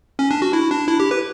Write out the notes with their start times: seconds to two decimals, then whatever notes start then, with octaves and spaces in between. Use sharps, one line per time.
0.19 C#4
0.31 D4
0.42 F#4
0.53 E4
0.71 D4
0.88 E4
1.00 G4
1.11 B4